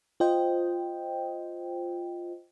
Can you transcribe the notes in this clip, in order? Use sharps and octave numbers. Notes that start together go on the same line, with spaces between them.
F4 C5 D#5 G5